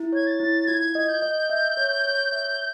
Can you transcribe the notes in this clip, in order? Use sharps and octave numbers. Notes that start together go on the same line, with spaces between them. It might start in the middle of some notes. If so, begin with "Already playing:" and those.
Already playing: E4
C#5 G#6
A6
E4
F4 G#6
D#5
G6
D#5
E5
C#5
C#5
E5